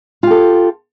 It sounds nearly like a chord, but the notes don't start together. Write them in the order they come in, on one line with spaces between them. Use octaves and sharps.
F4 G4 A4